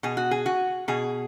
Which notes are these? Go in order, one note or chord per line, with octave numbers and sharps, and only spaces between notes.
B2 G#4
F#4
G#4
F#4
B2 G#4